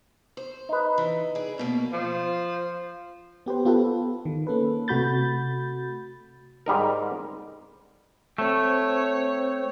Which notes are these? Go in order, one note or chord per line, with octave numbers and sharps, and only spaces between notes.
C5
D#4 B4
E3
G#4 D5
F#2 B2 A#3
F3
B3 G4 B4 C5
B3 F4 G4 A4 B4
D#3
A#3 C#4 A4 B4
C3 A3 F#4 B5 G6 A6
G#2 G3 D#4 A#4
A3 C4 C5 C#5